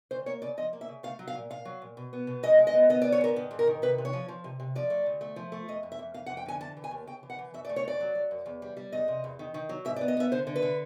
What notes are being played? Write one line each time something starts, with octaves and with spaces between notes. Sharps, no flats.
D2 C5
A#3 C#5
C#3 D5
F3 D#5
A#3
E5
C#3
A3 F5
F#3
F5
A#2
A#2 F5
F#3
A#2
B2
B3
B2
G#3 D#5
G#3
D#5
B3
B3 D#5
D5
B3
C#5
G#2 A#4
D#3
G#2
A#4
D#3
C3 B4
C3
C#5
F3
F3
C3
C3
F3 D5
A3
D2
A3
F3
A3
F2 D#5
F2
E5
F2
F2 F5
F#5
F2
G5
D3 G#5
E3 A5
E3
G#5
D#2
C#3 G5
E3
F#5
E3
F#2 E5
D5
A3
C#5
F#2 D5
F#3
F#3
F#2
E2
G3
G3
E2 D#5
C3
E2
D#3
D#3
F#3
G#2 E5
D5
B3
D#5
B3 E5
D3 C5
D3
B4
D3